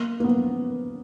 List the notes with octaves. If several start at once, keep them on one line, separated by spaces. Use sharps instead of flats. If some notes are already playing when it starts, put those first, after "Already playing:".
Already playing: A#3
A#3
B3